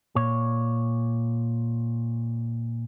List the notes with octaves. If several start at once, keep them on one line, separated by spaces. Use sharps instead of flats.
A#2 C#5